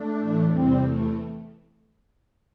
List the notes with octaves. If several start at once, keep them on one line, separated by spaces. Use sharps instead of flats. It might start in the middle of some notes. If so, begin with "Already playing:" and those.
Already playing: A3 D4
A2 E3
E2 C3 E3 G3 C4
E2 E3 A3